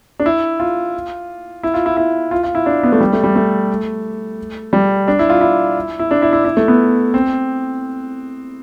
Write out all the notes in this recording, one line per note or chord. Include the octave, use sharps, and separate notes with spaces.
D4
E4
F4
E4
F4
E4
E4
F4
F4
E4
D4
B3
A3
G3
A3
G3
A3
G3
D4
E4
F4
E4
E4
D4
E4
E4
E4
A3
B3
C4